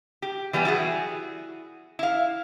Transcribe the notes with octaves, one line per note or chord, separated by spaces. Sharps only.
G4
E3 G3 B3 G#5
E4 F#4 G#4
E4 F5